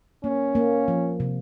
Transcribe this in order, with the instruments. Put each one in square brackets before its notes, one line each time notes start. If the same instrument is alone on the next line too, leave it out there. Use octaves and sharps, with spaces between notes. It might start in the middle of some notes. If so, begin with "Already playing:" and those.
[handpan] A#3 [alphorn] C#4
[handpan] A#3
F3
C3